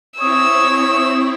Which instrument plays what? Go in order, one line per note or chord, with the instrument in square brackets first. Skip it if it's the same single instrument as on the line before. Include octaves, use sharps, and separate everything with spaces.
[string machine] C4 E4 [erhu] C#5 [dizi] D#6 [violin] E6